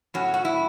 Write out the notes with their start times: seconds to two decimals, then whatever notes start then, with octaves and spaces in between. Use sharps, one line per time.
0.14 A2 F#3 C#4 F#4
0.34 F#4
0.45 E4